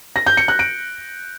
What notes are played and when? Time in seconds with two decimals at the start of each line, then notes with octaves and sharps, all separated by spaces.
0.16 A#6
0.27 G6
0.37 C#7
0.48 F#6
0.59 D7